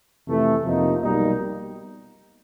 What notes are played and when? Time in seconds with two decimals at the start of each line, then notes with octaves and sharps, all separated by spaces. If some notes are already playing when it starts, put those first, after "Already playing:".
0.26 F2 C3 E3 A3
0.63 F2 C3 F3 A#3 D#4
1.02 B1 B2 G3 A#3 D#4